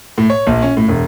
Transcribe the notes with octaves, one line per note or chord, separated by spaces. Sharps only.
A2
C#5
A#1
C#4
A2
E1